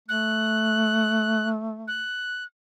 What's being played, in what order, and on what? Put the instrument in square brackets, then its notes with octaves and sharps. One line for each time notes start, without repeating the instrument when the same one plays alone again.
[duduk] A3 [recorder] F#6
[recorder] F#6